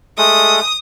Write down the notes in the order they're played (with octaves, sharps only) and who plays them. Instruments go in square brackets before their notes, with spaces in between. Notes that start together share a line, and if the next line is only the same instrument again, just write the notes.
[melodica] G#3 A3 A4 [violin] D#6